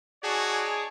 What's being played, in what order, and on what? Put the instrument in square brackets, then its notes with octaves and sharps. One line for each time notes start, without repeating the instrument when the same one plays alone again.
[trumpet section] D#4 C#5 D5 [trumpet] F#4 [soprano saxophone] G#4 [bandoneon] G#5 A5